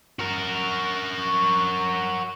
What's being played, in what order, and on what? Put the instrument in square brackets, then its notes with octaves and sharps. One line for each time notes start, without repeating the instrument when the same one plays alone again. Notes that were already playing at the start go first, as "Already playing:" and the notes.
[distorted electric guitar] F#4 A#4